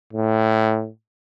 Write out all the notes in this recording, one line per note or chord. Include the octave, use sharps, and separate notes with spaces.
A2